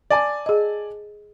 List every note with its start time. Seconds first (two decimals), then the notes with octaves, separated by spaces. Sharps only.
0.10 D5 G#5 A5
0.46 G#4 D#5